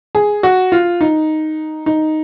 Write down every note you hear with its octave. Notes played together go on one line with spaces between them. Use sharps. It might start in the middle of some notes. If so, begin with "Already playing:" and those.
G#4
F#4
F4
D#4
D#4